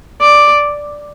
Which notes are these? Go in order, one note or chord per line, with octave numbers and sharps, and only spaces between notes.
D5